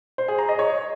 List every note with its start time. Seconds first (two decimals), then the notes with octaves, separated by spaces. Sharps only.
0.18 C5
0.28 G#4
0.39 A#5
0.49 D#5
0.59 C#5